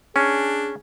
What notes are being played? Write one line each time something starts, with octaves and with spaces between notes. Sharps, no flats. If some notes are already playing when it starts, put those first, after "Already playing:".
C#4 D4 G#4